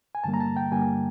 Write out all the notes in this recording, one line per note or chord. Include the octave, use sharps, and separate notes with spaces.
G#5
G2 D3 G3 A#3 A5
A#5
A5
G5
G2 D3 G3 A#3 G#5